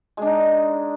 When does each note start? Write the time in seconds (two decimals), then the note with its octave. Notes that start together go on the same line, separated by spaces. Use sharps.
0.17 G#3
0.22 D4
0.27 D#4